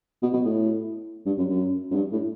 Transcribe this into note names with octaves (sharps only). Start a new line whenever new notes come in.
B2
B2
A2
G2
F#2
F#2
F#2
G2
A2